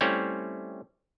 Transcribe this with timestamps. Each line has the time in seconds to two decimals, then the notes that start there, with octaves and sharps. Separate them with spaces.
0.01 G3 A3 C4 C#4 E4 C#5